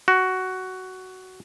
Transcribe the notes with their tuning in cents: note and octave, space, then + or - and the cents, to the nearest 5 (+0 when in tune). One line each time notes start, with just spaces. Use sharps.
F#4 +10